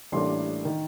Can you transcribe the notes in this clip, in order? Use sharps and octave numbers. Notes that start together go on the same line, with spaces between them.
A1 A2 G3 A#3 D4 C6
D#3